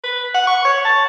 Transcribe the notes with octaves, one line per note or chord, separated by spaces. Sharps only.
B4
F#5
C#6
C#5
A5